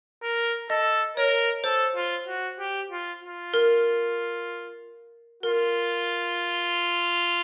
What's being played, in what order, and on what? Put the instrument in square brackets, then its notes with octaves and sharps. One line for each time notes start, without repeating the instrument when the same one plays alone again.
[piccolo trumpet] A#4
[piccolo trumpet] A4 [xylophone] D#5
[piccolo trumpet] A#4 [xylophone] C#5
[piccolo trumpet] A4 [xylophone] C5
[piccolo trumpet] F4
F#4
G4
F4
F4
[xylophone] A#4
[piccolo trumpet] F4 [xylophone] A#4